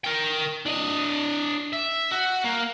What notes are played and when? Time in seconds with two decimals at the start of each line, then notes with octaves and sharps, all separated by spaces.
0.04 A#4 G5
0.66 D4 D#5
1.73 E5
2.11 F#4
2.44 A#3